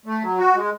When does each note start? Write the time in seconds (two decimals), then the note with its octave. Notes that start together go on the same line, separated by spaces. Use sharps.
0.06 A3
0.22 F#3
0.38 F#4
0.55 G#3